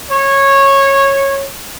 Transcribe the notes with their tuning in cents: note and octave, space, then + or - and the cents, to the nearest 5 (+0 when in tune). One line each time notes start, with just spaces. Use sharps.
C#5 -15